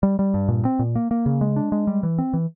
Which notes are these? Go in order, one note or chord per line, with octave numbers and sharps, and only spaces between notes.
G3
G3
G2
A#2
C4
A#2
A#3
A#3
C#3
G#3
D4
G#3
G3
E3
C4
E3